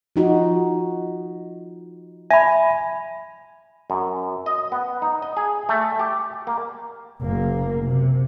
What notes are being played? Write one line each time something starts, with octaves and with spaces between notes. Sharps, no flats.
F3 D#4 F#4
E5 G#5 B5
F#2
D#5
B3
D#4
D#5
G#4
A3
G4
A#3
F#1 A#3
C3